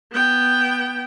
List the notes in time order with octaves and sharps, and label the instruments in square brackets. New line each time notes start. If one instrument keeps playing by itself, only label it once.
[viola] B3 G5